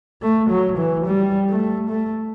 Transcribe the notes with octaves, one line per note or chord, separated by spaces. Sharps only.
A3
F#3
E3
G3
A3
A3